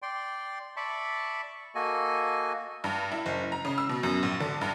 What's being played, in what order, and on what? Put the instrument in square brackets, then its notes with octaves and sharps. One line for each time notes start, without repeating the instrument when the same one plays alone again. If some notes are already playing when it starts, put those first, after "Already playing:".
[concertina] D5 G5 C6
D5 E5 A5 B5 C#6
A#3 F#4 A4 D#5 G#5
[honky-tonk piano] G2
E4
F#1
A#5
C#3
E6
B2
F#2
A#1
D3
G2